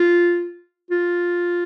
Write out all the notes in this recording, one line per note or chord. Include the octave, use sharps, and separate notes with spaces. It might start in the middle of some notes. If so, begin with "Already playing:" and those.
Already playing: F4
F4